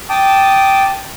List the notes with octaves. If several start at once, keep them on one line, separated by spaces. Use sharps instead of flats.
G5 A5 D6 D#6